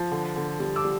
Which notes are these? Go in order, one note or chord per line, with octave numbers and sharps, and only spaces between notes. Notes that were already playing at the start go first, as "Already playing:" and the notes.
Already playing: F3
D3
D3
G3
D6 E6
G3